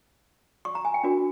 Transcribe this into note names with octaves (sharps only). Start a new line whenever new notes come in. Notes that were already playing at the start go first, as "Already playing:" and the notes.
C#6
A#5
G#5
G5
D4 F#4 A#4